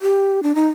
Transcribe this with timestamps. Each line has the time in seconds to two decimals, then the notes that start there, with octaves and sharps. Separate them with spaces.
0.01 G4
0.43 D4
0.55 D#4